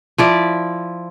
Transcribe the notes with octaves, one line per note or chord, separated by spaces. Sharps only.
F3 E4 D5